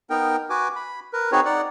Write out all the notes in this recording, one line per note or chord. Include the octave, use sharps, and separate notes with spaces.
B3 D#4 A#4 G5
F#4 B4 G#5 D6
B5
A#4 B4
C4 D#4 F#4 G#4 B4 C#5
D#4 D5 F#5